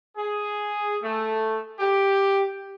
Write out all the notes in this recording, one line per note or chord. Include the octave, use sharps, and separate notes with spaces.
G#4
A3
G4